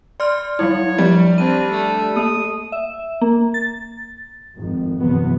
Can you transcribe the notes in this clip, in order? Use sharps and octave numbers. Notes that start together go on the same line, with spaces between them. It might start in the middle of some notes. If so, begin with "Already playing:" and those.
D5 C6 F6
F#3 G3 E4 C#5
F3 G3
C4 D4 D#7
A3
A#3 D#6
E5
A#3
A6
G#1 F2
G1 E2 C3 F#3 B3